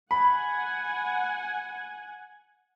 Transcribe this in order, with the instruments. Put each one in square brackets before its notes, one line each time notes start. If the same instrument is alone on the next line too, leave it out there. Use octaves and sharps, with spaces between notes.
[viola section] F#5 G#5 [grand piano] B5